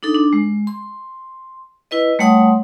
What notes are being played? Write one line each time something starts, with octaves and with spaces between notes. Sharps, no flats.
D4 D#4 A4
D4
G#3
C6
E4 B4 D#5
G3 A3 C#5 F#5 C6 D#6